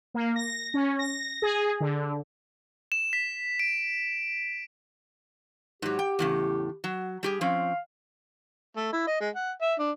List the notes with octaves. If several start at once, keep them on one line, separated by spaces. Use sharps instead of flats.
A#3
A#6
C#4
A#6
G#4
D3
E7
B6
D7
G#2 F#3 G4
G5
E2 A2 C#3
F#3
G3 G4 G#4
F3 C4 C#4 F5
A3
E4
D#5
G#3
F#5
E5
D4